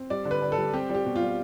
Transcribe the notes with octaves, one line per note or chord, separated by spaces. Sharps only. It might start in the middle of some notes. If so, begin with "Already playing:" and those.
Already playing: C4
G3 D5
D3
B4
D3
A4
G3
C4 G4
G3 G4
B2
F4
G3